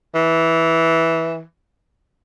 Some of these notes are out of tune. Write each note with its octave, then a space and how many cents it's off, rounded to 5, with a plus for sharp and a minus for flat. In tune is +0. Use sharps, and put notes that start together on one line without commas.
E3 -10